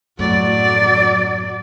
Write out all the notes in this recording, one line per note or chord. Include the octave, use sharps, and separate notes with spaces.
F#2 A2 F#3 D5